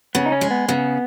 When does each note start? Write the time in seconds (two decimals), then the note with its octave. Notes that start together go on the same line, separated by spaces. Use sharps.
0.15 C#3 B3
0.26 D#4
0.32 C#4
0.41 G#3
0.51 B3
0.69 C#3 B3